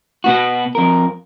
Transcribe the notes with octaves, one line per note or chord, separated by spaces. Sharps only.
B2 B3 F#4
F2 A#4